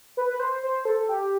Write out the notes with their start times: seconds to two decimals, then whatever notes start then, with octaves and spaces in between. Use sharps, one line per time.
0.17 B4
0.30 B4
0.40 C5
0.63 C5
0.85 A4
1.09 G4